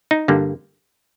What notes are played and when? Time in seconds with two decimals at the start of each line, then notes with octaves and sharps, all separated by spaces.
0.11 D#4
0.28 G2 D3 G3 A#3